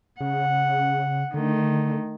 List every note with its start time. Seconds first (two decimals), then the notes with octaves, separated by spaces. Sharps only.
0.20 C#3 F#5
1.34 D3 D#3 A3